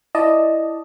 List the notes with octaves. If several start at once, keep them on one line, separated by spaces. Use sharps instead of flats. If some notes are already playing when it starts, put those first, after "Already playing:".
E4 D5 D#5 A5